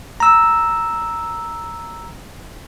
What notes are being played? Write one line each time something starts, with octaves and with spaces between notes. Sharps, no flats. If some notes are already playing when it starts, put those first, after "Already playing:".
A#5 E6